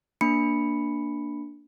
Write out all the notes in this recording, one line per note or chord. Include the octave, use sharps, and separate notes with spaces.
A#3 D4 B5 C#7